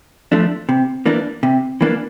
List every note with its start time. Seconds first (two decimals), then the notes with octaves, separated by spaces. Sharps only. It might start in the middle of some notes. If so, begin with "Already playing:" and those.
0.32 F3 A3 D4
0.69 C3
1.06 E3 A#3 D4
1.43 C3
1.81 E3 A#3 D4